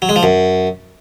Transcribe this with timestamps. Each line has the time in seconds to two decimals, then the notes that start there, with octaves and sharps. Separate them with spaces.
0.02 F#3
0.09 G#3
0.16 F3
0.23 F#2